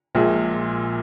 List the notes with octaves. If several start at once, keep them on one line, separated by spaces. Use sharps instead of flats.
A#1 A#2 G#3